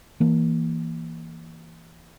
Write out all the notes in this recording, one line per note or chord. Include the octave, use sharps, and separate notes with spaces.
E3 A#3